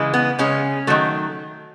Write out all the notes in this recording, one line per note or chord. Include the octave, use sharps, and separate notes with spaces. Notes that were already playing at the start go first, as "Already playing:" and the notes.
Already playing: C#3 E3 G#3
B3
C#3 G#3 C#4
D#3 F#3 A3